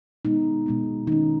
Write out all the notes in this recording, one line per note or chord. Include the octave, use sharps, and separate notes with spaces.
B2 G#3 B3 D#4
B2 G#3 B3
D#3 A#3 C#4 D#4